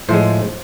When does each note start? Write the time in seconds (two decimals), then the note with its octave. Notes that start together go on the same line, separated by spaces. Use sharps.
0.09 A2 F3 G#3 C5